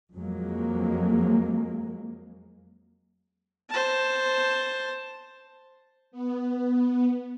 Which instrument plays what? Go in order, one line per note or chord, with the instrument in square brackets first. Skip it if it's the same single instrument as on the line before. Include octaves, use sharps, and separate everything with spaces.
[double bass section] F2 F#3 G#3 A#3
[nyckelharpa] C5 A5
[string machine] B3